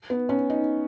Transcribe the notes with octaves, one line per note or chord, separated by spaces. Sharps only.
B3
C#4
D#4